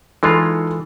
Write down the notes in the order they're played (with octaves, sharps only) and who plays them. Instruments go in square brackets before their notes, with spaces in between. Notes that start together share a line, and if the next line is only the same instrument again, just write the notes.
[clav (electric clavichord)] E3 G#3 F4 [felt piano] D#4 A4 C6